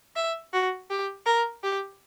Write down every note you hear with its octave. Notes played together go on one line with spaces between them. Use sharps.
E5
F#4
G4
A#4
G4